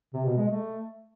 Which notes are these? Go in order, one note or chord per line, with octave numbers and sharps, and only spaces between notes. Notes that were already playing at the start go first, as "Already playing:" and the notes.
C3
B2
G#3
A3